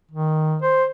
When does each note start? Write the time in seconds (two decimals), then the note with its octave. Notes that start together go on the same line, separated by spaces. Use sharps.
0.11 D#3
0.62 C5